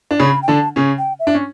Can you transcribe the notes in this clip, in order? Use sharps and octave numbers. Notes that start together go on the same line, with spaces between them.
D4
C#3 C#4 B5
G5
D3 D4 A5
C#3 C#4
G5
E5
D4
C#4